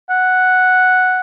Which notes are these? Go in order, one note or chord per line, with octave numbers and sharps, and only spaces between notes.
F#5